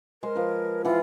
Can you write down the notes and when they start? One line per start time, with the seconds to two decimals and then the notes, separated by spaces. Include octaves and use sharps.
0.23 G#3 A#4 C5
0.35 F3 B4
0.85 E3 F4 F#5